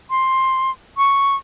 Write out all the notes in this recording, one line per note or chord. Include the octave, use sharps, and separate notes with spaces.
C6
C#6